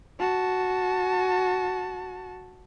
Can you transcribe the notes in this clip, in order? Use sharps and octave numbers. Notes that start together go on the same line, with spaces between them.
F#4 A5